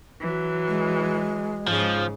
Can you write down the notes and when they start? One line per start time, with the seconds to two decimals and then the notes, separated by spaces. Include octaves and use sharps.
0.20 E3 F#3
0.68 G#3
1.68 G#2 C#3 F3